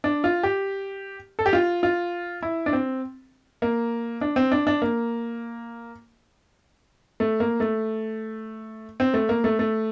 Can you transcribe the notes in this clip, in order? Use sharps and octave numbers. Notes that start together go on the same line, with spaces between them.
D4
F4
G4
A4
G4
F4
F4
E4
D4
C4
A#3
D4
C4
D4
D4
A#3
A3
A#3
A3
C4
A3
A#3
A3
A3